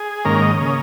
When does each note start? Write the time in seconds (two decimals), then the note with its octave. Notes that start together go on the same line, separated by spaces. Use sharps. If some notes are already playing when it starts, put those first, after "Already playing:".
Already playing: G#4
0.25 G#2 D#3 A#3 C#4 A#4
0.42 D#5
0.57 C#3 A#3 C#4
0.66 D#5